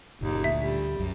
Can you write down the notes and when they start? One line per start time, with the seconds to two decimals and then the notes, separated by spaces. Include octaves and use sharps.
0.21 F#1 D#2 A#2
0.44 D2 E5
0.61 G3
1.00 C2 F#2